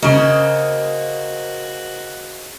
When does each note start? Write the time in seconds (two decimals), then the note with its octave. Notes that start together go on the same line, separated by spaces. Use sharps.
0.02 C#3 A#3 F#4 C5 D#5